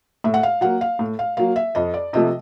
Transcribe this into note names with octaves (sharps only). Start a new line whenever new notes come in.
A2 E5
F#5
F5
F#3 A#3 F#5
F5
A2
F5
F#3 A#3 F5
E5
F2 D#5
D5
C3 F3 A3 D#5